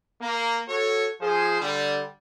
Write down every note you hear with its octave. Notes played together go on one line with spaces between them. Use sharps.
A#3
F#4 A4 C#5
F3 G#4 C5
D3 G3